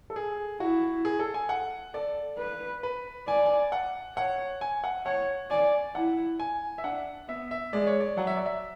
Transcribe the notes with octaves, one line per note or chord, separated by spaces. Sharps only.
A4
G#4
E4 F#4
G#4
A4
G#5
F#5
A4 D5
B4
B4
D5 G#5
G#5
F#5
C#5 F#5
G#5
F#5
C#5 F#5
D5 G#5
E4 F#5
G#5
E5
D4 F#5
B3 E5
E5
G#3 D5
C#5
D5
F#3 F#5
E5
D5
E5